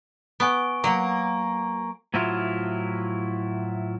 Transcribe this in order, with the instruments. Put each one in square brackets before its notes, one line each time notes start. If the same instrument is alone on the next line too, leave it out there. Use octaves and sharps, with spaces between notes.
[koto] B3 [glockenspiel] G#5 C#6 D7
[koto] F#3 [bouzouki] A#3
[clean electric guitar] A2 F3 F#3 E4 F4